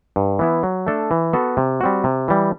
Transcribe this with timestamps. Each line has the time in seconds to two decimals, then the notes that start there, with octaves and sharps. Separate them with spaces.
0.16 G2
0.39 E3 B3 E4
0.63 F#3
0.87 A3 D4 A4
1.11 E3
1.33 B3 F#4 A4
1.57 C3
1.81 G3 C4 F#4
2.04 C3
2.28 E3 G3